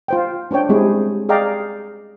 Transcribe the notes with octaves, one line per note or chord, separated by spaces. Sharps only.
F4 C5 G5
C#4 D4 C5 C#5 G5
G3 G#3 C4 C#4 E4 G#4
G#4 D5 D#5 F5 G5 A#5